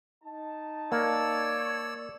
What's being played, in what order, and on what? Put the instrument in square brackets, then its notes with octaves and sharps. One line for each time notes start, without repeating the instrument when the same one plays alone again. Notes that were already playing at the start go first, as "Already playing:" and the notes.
[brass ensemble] D#4 A5
[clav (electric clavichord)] A#3 [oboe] C#5 [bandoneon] D5 E6